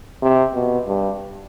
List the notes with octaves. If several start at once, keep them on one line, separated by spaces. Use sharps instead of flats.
C3
B2
G2